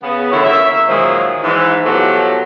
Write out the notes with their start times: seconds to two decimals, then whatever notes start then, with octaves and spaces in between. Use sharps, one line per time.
0.03 C#3 B3
0.32 D3 D#3 F#3 C#4 E4
0.45 A#3 C#4 E5
0.88 A#2 D#3 F3 F#3 G#3
1.43 G#2 E3
1.85 B2 F3 F#3 A3 G4